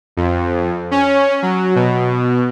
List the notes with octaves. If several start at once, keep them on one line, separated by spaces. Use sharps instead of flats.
F2
C#4
F#3
B2